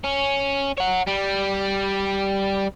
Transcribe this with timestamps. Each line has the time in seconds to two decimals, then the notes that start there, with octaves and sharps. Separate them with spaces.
0.04 C#4
0.77 C#5 F#5
1.07 G3